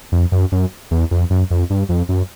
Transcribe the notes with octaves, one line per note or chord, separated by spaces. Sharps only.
F2
F#2
F#2
E2
F2
F#2
F2
G2
F2
F#2